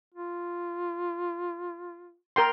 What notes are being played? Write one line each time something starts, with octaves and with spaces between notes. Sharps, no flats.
F4
A#4 G5 C6